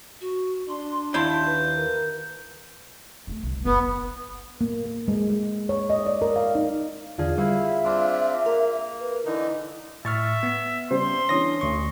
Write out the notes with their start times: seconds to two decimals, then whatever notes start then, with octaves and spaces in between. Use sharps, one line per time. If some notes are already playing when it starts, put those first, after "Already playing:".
0.21 F#4
0.69 D4 C6
1.14 D#2 E4 A5 C6 G6
1.46 B4
1.77 A#4
3.27 D3 A3
3.43 C2 D4
3.65 F#1 B3
4.61 A#3
4.86 A#3
5.08 G#3
5.30 G#3
5.69 C#5
5.90 D#5
6.07 D5
6.22 A#4
6.36 F5
6.55 D#4
7.18 E2 D3 F4 G#4 D5
7.38 G3 E4 C5 E5 F5
7.85 C4 D4 F4 D6
8.46 A#3 A#4
9.00 B4
9.26 D3 E3 D#4 E4
10.05 A2 E5 C#6 F6 A6
10.43 B3
10.91 C#3 G3 C5 C6
11.29 E3 C#4 D4 D#6 A#6
11.61 D2 C#6